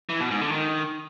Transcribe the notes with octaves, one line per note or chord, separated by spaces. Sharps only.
E3
B2
G#2
D3
D#3